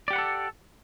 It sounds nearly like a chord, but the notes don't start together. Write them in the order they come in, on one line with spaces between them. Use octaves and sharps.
D5 G4 F#5 B4 A4